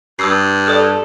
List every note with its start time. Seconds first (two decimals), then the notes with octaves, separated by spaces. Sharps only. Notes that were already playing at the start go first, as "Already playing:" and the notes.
0.19 G2 D#6 E6 C7
0.66 A4 D5 D#6 F6